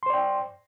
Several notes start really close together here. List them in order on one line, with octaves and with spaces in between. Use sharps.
C6 C5 D5 G5